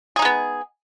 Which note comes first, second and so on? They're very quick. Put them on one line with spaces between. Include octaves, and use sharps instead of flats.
G#4 D#4 G#3 B3